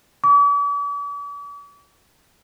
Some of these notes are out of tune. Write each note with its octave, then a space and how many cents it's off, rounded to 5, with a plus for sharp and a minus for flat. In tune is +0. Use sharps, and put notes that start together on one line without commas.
D6 -45